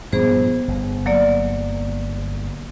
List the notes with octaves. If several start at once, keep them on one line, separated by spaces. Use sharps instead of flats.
G2 A#2 F3 B3 G#4 C5
G1
F#3 A#3 D5